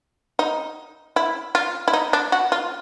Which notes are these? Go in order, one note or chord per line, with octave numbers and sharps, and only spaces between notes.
D#4
E4
F4
E4
D#4
D4
F#4
F4